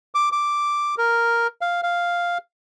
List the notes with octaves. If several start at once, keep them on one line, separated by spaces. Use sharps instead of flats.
D6
D6
A#4
F5
F5